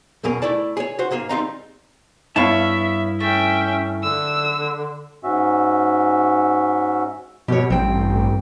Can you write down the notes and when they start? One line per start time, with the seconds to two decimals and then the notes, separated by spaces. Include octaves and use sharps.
0.24 B1 E2 B2 G#4 A#4
0.42 A3 E4 D5 A5
0.77 G#4 C#5
0.99 F#4 C5
1.11 G#2 A#3 G#4 F5
1.29 G3 G#3 C4 D#4 F5 A#5
2.36 G2 B3 E4 C#5 E5 F5 A5
3.20 A3 C#4 E5 G5
4.03 D3 E6
5.24 G#2 C#4 F#4 E5
7.48 B2 G4 C#5
7.70 A1 G2 C4 G5